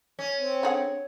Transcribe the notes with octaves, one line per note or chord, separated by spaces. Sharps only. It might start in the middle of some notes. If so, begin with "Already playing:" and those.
C#4
C4
D3 G#4 F#5